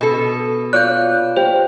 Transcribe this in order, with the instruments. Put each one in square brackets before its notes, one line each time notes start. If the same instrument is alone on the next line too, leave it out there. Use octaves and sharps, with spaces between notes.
[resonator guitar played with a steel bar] B2 A4
[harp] F4 C#5 D5 [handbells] F#6 G6
[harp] G4 [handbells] C5